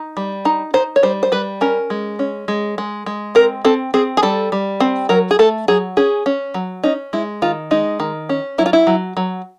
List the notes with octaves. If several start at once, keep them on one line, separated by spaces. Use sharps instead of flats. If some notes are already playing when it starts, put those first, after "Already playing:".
Already playing: D#4
G3
D#4
D#4 C5
C#5
G3 C5
C5
G3 B4
C#4 A#4
G#3
C#4
G#3
G#3
G#3
C4 A#4
C4 A4
C4 G#4
G#4
G3 A4
G3
C4
F#3 A#4
G#4
A3 A4
F#3 G#4
C#4 G#4
C#4
F#3
C#4 D#4
G#3 E4
D#3 F4
G#3 D#4
D#3
C#4
F#3 E4
F4
E4
F#3
F#3